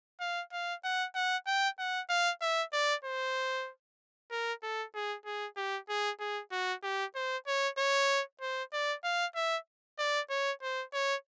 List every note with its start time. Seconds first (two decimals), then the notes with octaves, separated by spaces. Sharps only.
0.20 F5
0.52 F5
0.84 F#5
1.15 F#5
1.47 G5
1.79 F#5
2.09 F5
2.41 E5
2.73 D5
3.04 C5
4.31 A#4
4.63 A4
4.95 G#4
5.25 G#4
5.57 G4
5.89 G#4
6.20 G#4
6.52 F#4
6.83 G4
7.15 C5
7.47 C#5
7.78 C#5
8.41 C5
8.73 D5
9.04 F5
9.35 E5
9.99 D5
10.30 C#5
10.62 C5
10.93 C#5